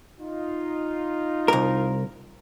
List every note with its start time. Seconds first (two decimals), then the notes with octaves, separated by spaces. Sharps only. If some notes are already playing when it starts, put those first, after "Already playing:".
0.20 D#4 F4
1.48 C2 A#4